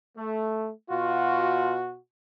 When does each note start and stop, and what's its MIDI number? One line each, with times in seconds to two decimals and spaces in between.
0.17 0.71 57
0.90 1.97 47
0.90 1.79 65
0.90 1.97 66